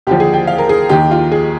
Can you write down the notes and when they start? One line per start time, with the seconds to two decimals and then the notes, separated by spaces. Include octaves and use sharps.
0.07 D#2 D3 F3 G4
0.20 G#4
0.34 G5
0.47 F5
0.58 A#4
0.69 G#4
0.89 D#2 D#3 G4
1.11 F4
1.32 G#4